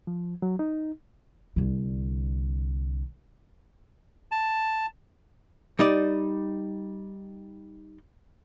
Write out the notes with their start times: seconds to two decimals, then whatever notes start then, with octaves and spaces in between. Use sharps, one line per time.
0.07 F3
0.42 F#3
0.59 D#4
1.56 C2 D3
4.32 A5
5.79 G3 D#4 D5